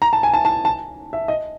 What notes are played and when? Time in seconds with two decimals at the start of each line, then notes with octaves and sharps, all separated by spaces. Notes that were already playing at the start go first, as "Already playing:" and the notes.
0.02 A#5
0.13 A5
0.23 G#5
0.34 A5
0.45 A5
0.65 A5
1.13 E5
1.28 D#5